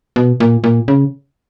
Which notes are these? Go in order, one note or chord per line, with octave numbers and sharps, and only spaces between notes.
B2
A#2
A#2
C#3